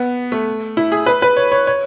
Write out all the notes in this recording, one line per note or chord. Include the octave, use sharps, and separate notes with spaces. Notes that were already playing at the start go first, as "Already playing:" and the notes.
Already playing: B3
A3
E4
G#4
B4
B4
C#5
C#5
C#5